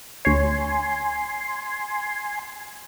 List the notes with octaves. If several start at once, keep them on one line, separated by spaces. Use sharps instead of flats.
D2 C#5 G#5 C6